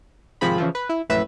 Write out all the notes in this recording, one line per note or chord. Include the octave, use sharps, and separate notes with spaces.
G#1 C3 F3 C4 G#4 B5
C#3 E3 F3
B4
E4
A#1 F#2 A2 B4 E5